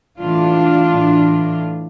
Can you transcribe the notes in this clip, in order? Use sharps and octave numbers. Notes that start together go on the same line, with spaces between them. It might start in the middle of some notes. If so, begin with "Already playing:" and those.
A2 E3 D4 F4
A2 E3